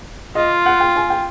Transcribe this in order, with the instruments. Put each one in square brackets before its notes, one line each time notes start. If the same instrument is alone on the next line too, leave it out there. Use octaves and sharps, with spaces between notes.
[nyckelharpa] F4 [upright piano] D#5
[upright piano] F#5
G5
G#5
G5